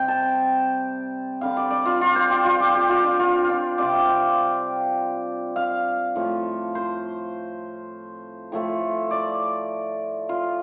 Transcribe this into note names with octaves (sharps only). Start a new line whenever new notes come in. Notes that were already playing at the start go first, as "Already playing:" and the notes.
Already playing: C3 G3 C4 G5
A5
D3 G3 C4 F5
D5
D5
F4
F4
C5
G4
F4
G4
G4
F4
D4
F4
D4
C3 G3 C4 D5
F5
G5
F5
A2 F3 A3
C5
A2 F3 A3
D5
F4